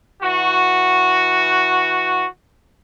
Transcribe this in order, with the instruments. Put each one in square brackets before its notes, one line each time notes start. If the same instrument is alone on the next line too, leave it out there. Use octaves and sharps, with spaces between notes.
[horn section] E3 F#4